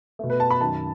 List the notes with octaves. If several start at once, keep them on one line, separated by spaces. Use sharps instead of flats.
B2 A3
B4
A5
B5
F#2 D#3 F#3 A5